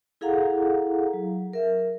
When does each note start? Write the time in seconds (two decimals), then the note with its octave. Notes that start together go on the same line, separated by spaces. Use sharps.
0.21 E4 G#4 A4 F5 F#5 A#5
1.13 F#3
1.53 A#4 E5